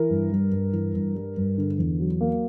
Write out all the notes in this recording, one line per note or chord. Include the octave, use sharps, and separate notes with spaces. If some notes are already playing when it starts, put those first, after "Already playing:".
Already playing: E3 A#4
G2
G3
G2
E3
G2
G3
G2
D3
E2
F#3
A#3